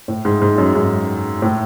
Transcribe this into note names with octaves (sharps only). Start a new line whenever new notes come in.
A2
G#2
G#2
F#2
G#2
A2